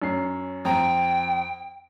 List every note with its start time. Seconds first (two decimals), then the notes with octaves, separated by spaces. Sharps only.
0.02 F#2 C#4 C7
0.65 F2 C4 G5 A#5